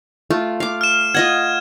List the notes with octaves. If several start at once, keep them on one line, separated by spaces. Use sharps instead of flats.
A3 F4
F5 D6
F6 E7
F4 D#5 F#5 G#6